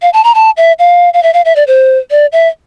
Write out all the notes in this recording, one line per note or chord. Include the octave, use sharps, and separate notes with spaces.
F5
A5
A#5
A5
E5
F5
F5
E5
F5
E5
D5
C5
D5
E5